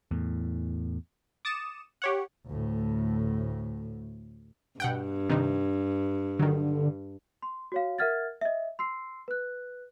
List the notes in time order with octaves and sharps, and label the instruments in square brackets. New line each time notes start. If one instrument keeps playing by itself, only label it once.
[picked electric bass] E2 A2
[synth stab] D6 D#6 A6 C#7 E7
G4 C#5 F#5
[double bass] D2 A2
[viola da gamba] G2 [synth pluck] B2 F#5 G5
[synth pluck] C3 D#3 D#4
[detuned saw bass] D3 [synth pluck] D#3 F#3
[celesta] C6
F#4 C#5 F5
A#4 E5 F#5 F6 G#6 A6
D#5 E5
C6 E6 C7
B4 F#6